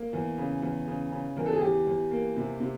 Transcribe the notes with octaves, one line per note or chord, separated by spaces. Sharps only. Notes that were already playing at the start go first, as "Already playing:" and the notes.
Already playing: A#3
E2
C#3
E2
C#3
C#3
E2 A#4
A4
G#4
E2 G4
E2
A#3
C3
C3